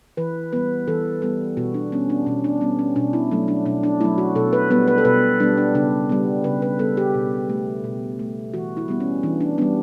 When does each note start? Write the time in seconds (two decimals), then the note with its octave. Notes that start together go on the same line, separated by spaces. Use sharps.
0.17 E3 B4
0.53 G3 B3 B4
0.87 E3 A4
1.22 G3 B3 A4
1.57 B2 F#4
1.74 D4
1.92 G3 B3 C#4
2.10 D4
2.26 B2 C#4
2.44 D4
2.61 G3 B3 C#4
2.79 C#4
2.96 B2 D4
3.13 E4
3.31 F#3 A3
3.48 D4
3.66 B2 D4
3.83 D4
4.01 F#3 A3 E4
4.18 F#4
4.35 B2 A4
4.53 B4
4.70 G3 B3 B4
4.88 B4
4.98 A4
5.05 B2 B4
5.40 G3 B3 D4
5.58 D4
5.75 C#3 D4
6.09 G3 B3
6.44 C#3 B4
6.62 B4
6.79 G3 B3 A4
6.97 G4
7.14 B2
7.49 A3
7.84 B2
8.19 A3
8.54 E3 F#4
8.77 E4
8.88 G3 B3
9.00 C#4
9.23 E3 D4
9.41 D4
9.58 G3 B3 D4